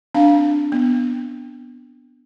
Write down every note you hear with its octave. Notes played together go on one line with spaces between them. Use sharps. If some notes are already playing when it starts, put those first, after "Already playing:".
C4 D4 F5
B3